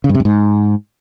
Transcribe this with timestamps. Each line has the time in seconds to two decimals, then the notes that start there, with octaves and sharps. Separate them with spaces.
0.04 C#3
0.09 G2
0.15 C3
0.20 G2
0.25 G#2